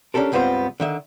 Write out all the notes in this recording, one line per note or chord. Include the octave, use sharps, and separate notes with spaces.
C#4 D4 G4 A4 A#4
C#2 G2 B3 C4 F4 C5
D3 D#3 E5